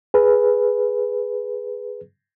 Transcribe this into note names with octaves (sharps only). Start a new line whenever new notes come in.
G#4 B4